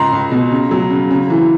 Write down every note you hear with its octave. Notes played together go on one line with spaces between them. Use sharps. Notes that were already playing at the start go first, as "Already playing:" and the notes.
Already playing: C#2 A#5 C6
C#2
B2
C#3
F#3
C#3
C#3
E3